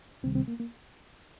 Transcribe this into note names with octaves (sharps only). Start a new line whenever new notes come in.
C#2 C3 D#3 G3 C4
C4
A#3
A#3